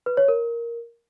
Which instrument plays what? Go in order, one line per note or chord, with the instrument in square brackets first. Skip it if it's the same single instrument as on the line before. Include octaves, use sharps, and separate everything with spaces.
[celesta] B4
C#5
A#4